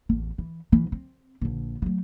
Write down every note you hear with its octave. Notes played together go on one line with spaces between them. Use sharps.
A1 E2
E3
B1 E3
C4
A#1 D3
F#3 A3